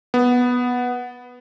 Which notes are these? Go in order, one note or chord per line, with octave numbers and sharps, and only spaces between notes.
B3